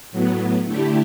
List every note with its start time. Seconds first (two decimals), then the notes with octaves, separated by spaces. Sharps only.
0.12 A2 F#3 B3
0.65 D3 A3 E4 G4